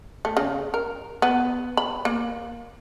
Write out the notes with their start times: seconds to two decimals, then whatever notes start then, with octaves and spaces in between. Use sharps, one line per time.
0.25 A3
0.37 C#3
0.74 A#4
1.22 B3
1.77 B5
2.05 A#3